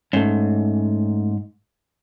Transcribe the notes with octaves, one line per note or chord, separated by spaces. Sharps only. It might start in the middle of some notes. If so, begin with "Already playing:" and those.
G#2 A3 C#4